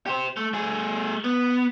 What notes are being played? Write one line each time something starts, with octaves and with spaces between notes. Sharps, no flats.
G4 C5
A3
A3 G#4
B3